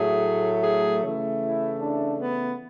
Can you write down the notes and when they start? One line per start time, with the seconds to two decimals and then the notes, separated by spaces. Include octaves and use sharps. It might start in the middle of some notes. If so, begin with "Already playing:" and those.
Already playing: A2 F#3 A3 G#4
0.63 G#4
1.02 C#3 E3 A3
1.41 E4
1.79 D4
2.17 B3